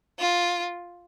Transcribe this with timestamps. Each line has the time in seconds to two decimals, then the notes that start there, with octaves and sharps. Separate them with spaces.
0.19 F4